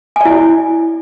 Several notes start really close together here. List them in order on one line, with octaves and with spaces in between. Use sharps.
G#5 D5 E4